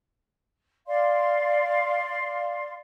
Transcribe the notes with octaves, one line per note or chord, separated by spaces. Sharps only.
D5 F5 C6